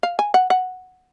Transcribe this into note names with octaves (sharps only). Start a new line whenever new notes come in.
F5
G#5
F#5
F#5